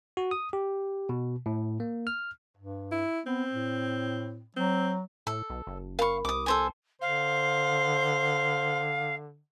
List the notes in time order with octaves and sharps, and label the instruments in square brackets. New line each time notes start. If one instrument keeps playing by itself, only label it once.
[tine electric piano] F#4
D#6
G4
B2
A2
A#3
F6
[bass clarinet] G2
[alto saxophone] E4
[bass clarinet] B3 [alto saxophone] C4
[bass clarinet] A2
[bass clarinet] F#3 [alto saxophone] C4
[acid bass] A2 [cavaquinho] A4
[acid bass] B1
F#1
[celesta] A#4 B5 [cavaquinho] F5 C#6
[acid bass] C2 [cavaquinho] D6 D#6
[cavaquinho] A4 C5 G#5
[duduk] D3 [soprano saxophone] C5 [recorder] F5